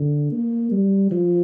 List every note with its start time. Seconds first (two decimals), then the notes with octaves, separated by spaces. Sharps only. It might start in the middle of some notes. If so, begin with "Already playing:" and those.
Already playing: D3
0.32 A#3
0.72 G3
1.11 F3